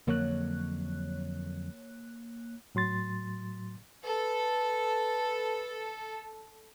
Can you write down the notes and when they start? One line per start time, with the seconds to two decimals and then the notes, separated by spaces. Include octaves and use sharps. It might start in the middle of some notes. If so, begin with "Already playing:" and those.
0.07 F2 D3 F#3 A#3 C#5 F#6
2.75 A2 F#3 C6 A6
4.05 A4 B4